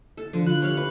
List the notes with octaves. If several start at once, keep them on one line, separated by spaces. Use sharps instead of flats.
A4
D3 F3
F4 F#6
G4 C#5 F5
B4